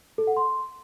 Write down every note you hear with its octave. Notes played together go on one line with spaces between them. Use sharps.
A4
F#5
C6